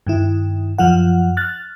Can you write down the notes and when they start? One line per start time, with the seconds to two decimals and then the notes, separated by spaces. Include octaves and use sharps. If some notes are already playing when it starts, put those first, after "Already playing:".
0.07 G2 D#3 E4
0.78 F#2 F3 F4 F#5
1.37 F6 F#6 A6